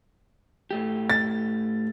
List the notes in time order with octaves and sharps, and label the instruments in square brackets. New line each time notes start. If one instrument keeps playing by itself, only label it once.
[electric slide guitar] A2 A3 G4
[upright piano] A6